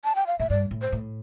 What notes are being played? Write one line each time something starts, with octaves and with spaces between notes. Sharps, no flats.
A5
G5
F5
A2 E5
G2 D5
A2
C5
A2